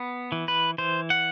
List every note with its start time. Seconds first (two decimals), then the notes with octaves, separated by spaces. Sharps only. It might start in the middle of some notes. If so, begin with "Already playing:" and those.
Already playing: B3
0.32 E3
0.48 B4
0.78 E3 C5
1.10 F#5